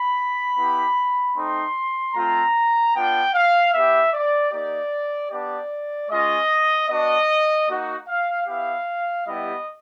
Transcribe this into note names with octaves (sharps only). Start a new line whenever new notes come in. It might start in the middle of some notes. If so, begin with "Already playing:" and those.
Already playing: B5
B3 E4 G4
A3 C4 D#4 C6
A3 C4 F4 A#5
B3 D4 F4 G5
F5
B3 E4 G4 E5
D5
A#3 D#4 G4 D5
B3 D4 G4 D5
G#3 C#4 F4 D#5
B3 D4 F#4 D#5
A#3 D#4 F#4
F5
B3 E4 G4 F5
G3 B3 E4 G4 D#5